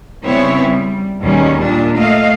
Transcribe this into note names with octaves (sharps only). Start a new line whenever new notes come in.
C#3 G3 B3 C4 E4 C#5
G3
D#2 B2 D#3 G3 G#3 C#4
A#2 D4
A3 D#5 F5